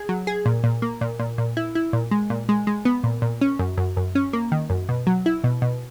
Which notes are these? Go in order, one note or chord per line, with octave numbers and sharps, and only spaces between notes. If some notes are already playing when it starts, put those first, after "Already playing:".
Already playing: G#4
F#3
G#4
A#2
A#2
A#3
A#2
A#2
A#2
E4
E4
A#2
G#3
A#2
G#3
G#3
B3
A#2
A#2
C#4
F#2
F#2
F#2
C#4
A#3
D#3
F#2
B2
F#3
E4
B2
B2